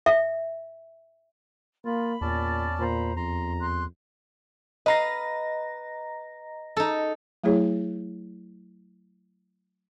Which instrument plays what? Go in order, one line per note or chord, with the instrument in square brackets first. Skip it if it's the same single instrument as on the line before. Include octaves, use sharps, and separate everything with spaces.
[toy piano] E5
[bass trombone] A#3 [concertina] F4 [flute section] B5
[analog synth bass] E2 [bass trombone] A#2 [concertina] C#4 D5 A5
[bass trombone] A#2 [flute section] C5 A#5 B5
[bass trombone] F2 [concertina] A#5 [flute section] C6
[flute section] C6 F#6
[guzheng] B4 F5 [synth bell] D#5 A#5 A#6
[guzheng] D#4 A4
[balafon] F#3 A3 E4 G#4 C#5